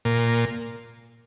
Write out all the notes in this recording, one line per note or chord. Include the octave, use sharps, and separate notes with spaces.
A#2